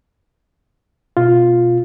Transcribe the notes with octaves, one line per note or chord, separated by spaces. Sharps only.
B2 F4